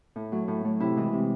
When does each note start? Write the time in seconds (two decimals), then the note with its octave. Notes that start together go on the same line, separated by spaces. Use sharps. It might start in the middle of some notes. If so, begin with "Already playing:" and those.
0.16 A2
0.32 F#3 A3
0.48 A2
0.65 F#3 A3
0.80 C3 E4
0.97 E3 G#3
1.13 C3